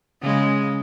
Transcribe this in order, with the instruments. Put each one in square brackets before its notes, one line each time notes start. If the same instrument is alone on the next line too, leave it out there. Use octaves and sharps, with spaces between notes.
[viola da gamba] C#3 G#3